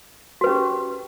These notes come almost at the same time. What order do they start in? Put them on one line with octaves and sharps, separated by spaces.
F#4 B4 C#4 G4